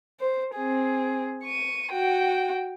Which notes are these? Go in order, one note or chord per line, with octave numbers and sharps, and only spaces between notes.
C5
C4 G#4
C#6 D#7
F#4 G5